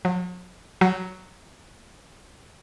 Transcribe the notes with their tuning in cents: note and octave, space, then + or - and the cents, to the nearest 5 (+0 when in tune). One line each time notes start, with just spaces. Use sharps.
F#3 -40
F#3 +5